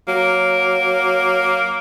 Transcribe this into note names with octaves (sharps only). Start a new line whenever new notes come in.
F#3 A#3